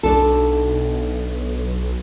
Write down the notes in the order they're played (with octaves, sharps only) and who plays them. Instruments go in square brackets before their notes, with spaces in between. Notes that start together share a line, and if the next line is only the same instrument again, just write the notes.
[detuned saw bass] B1 [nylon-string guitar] D4 A4